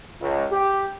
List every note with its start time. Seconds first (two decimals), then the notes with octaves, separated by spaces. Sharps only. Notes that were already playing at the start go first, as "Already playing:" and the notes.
0.20 C#2
0.50 G4